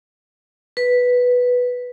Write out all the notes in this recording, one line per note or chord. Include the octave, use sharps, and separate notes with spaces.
B4